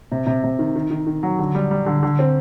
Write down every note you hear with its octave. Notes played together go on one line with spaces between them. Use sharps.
C3
C3
C3
D#3
D#3
D#3
D#3
F#3
D3
G3
G3
D3
D3
C4